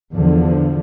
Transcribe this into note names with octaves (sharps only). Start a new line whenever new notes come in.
E2 D3 F3